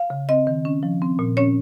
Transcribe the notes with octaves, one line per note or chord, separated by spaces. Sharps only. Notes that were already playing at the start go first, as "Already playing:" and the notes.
Already playing: F5
C#3
C4 D#5
D#3
C#4
F3
C4
A#2
C#4 C#5